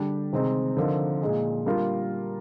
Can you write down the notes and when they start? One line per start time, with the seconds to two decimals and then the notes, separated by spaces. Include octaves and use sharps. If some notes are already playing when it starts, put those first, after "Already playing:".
Already playing: D3 G3 D4 G4
0.33 C3 D#3 G#3 C4 D#4
0.77 D3 F3 C4 D#4 A#4
1.22 A#2 G#3 D#4 G#4
1.66 G3 A#3 D4 F4 A#4